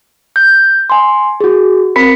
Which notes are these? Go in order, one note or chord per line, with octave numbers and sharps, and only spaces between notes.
G6
G#5 C6
F#4 G#4
C4 A#4 B5 B6 C#7